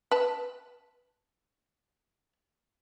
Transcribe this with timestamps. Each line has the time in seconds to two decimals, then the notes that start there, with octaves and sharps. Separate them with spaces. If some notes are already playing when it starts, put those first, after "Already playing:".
0.11 B4 A5